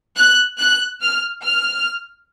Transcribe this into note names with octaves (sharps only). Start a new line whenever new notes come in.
F#6
F#6
F6
F6